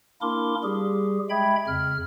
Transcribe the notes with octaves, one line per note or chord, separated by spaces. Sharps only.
A#3 D4 E4 A#4 C6 D6
G3 G4 G#4
G#3 E5 G5 B5 G#6
F2 C#3 F6